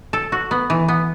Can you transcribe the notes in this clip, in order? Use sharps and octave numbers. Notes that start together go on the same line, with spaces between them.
A4
F#4
B3
E3
B3